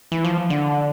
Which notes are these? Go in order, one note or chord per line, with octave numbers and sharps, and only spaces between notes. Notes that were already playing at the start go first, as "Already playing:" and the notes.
E3
F3
D3